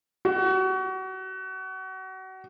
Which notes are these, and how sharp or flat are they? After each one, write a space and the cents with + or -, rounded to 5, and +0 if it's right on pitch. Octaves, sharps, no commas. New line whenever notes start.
F#4 +30